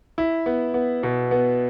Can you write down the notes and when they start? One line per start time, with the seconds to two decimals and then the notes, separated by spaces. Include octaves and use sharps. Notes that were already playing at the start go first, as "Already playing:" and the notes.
0.18 E4
0.46 B3
0.74 B3
1.03 B2
1.31 B3